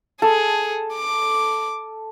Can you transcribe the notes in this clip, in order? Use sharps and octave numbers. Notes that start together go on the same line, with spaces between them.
G#4 A4
D6